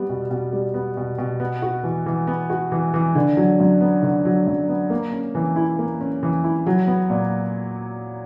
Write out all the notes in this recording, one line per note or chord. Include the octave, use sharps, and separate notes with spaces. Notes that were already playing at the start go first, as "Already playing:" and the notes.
Already playing: G3 B3
B2
B2
G3
B3
B2
B2
B3
F#4
E3
E3
B3
F#4
E3
E3
D3
F#3
F#2
B3
D3
F#3
F#2
B3
A#3
C#4
E3
E4
A#3
C#4
E3
E4
F#3
B3
A#2